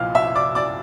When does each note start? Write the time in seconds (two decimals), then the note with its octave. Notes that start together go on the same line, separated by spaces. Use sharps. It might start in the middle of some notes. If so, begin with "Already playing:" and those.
Already playing: B1 A#2 F3 F5 F6
0.15 E5 E6
0.35 D5 D6
0.55 D5 D6